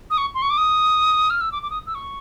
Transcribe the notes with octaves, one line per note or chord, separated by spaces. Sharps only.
D#6
C#6
C6
C#6
D6
D#6
F6
E6
D6
D6
D#6
E6
C#6